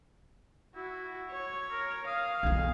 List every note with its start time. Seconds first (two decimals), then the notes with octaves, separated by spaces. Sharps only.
0.76 E4 F#4
1.31 C#5
1.71 A#4
2.07 F5 D#6
2.43 B1 E2 G#4